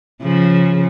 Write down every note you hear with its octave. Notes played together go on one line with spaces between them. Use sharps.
C#3 F3